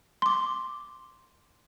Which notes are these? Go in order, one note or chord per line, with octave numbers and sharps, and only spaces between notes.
C6 D6